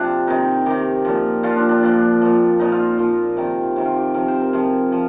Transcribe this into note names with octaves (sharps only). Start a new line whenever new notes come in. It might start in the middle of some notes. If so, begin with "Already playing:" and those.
Already playing: C3 F3 D4 F4
C3 D#3 D#4
C3 D#3 G4
A#2 F3
A#2 F3 F4
D4
D4
A#2 F3
A#2 F3
A#2 F3 D#4
F4
A#2 F3
C3 D#3
C3 D#3
F4
G4
C3 F3 A#4
C5
A#4
C3 F3 G#4
F3